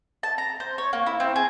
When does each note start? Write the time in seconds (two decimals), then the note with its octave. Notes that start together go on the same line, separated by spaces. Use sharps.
0.23 A5
0.38 A#5
0.60 C5
0.78 C#5
0.93 A#3
1.06 E4
1.20 C4
1.36 G#4